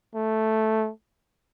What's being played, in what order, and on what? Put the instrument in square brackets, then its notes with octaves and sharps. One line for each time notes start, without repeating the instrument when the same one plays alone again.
[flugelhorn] A3